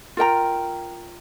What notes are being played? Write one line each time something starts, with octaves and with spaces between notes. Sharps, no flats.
F4 A#4 G5 A#5